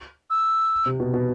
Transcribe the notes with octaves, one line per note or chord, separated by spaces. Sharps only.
E6
C3
B2
B2